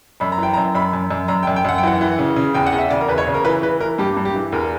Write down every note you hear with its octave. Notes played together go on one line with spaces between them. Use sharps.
F#2 B5
A#5
E3 G5
A#5
F#2
F#2 B5
F#2
F#2
F#2 A#5
G5
F#2
G5
F#2 F#5
G5
E3 F#5
E3
C#3
C#3
E2 G5
F#5
E2
E5
C#3 D5
A#4
E2 B4
C#5
C#3
A#4
E3 B4
E3 B4
E3 A#4
G2 G4
G2
G4
E3
E2 A#4